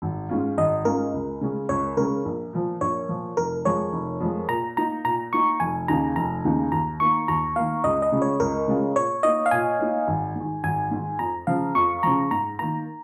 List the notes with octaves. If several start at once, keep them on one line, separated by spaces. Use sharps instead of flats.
G#1
G#2 G#3 C#4 F4
G#1 D#5
G#2 G#3 C#4 F4 A#4
C#2
C#3 G#3 C#4
C#2 C#5
C#3 G#3 C#4 A#4
A#1
A#2 F3
A#1 C#5
A#2 F3
F1 A#4
F2 F3 G#3 C#5
F1
F2 F3 G#3
A#2 A#5
A#3 D#4 A#5
A#2 A#5
A#3 D#4 C#6
F1 G#5
D#2 C#3 A#3 D#4 A#5
F1 A#5
D#2 C#3 A#3 D#4
D#2 A#5
D#3 A#3 C#6
D#2 A#5
D#3 A#3 F5
C#2 D#5
D#5
C#3 G#3 F4
C#5
C#2 A#4
C#3 G#3 F4
A#2 C#5
A#3 D#4 D#5
F5
A#2 G#5
A#3 D#4
G#1
G#2 D#3
G#1 G#5
G#2 D#3
F2 A#5
C#3 F3 F5
F2 C#6
C#3 F3 A#5
G#2 A#5
D#3 A#3 A#5